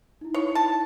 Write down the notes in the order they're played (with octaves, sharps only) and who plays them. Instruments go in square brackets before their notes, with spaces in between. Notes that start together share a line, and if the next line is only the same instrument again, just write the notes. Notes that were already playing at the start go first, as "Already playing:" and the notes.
[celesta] D#4 E4
[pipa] C#5
A5